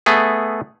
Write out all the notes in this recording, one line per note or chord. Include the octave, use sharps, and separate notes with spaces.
A3 B3 G#4